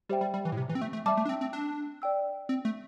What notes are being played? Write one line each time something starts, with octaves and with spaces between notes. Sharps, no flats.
G3 G4 C5 E5 G5
G3
G3
E3
A2
C3
E3
C4
A3
A3
G3 E5 A5 D6
A3
D4
C4
C4
D4
D5 G5 E6
C4
A3